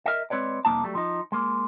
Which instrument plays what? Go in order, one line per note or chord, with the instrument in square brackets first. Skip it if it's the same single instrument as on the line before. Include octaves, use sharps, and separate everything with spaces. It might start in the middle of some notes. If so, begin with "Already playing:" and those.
[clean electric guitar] A#4 D#5 E5
G#3 C4 B4 C#5 D5
C2 F2 F3 A#3 D#4 A5
F#3 G3 A3
F3 D#4
G#3 A#3